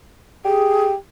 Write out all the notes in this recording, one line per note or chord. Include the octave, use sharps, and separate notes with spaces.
G4 G#4